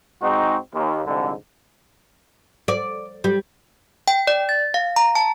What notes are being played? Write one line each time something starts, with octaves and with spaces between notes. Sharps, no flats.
G#2 G#3 C4 D#4 F#4
D#2
C2 F2 G#2 D3
D5
G3
G5
D5
A6
F5
A#5
A5